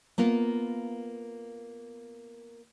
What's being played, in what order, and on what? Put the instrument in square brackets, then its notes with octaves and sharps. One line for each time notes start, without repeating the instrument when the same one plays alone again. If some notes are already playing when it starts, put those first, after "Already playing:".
[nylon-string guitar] A#3 B3 F4 A#4